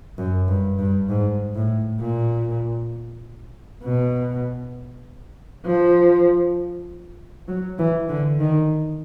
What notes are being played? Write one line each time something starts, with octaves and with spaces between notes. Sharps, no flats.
F#2
G2
G2
G#2
A2
A#2
B2
F3
F#3
E3
D3
D#3